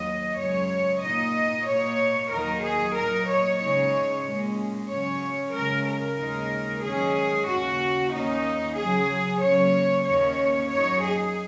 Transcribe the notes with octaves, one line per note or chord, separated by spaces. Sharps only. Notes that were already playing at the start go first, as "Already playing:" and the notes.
Already playing: D#2 F#3 D#5
F#2 C#3 G#3 C#5
A#2 A#3 D#4 D#5
A#2 A#3 D#4 C#5
D#2 D#3 F#3 D#4 A#4
G#4
A#2 F#3 D#4 A#4
C#5
C#3 G#3 D#4 C#5
A#2 G#3 C#4
C#3 F#3 C#4 C#5
C#3 G#3 C#4 A#4
A#4
D#2 C#3 G#3 D#4
F#2 D#3 G#3 C#4 G#4
D#2 C#3 A#3 C#4 F#4
D#2 D#3 A#3 C#4 D#4
C#3 F#3 C#4 G#4
C#3 F#3 A#3 C#5
D#2 D#3 A#3 C#4 C#5
F#2 F#3 D#4 C#5
G#4